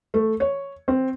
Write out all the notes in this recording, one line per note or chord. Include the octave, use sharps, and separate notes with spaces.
A3
C#5
C4